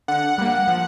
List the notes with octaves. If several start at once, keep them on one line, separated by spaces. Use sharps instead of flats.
D3 F#5
G3 A#3
F3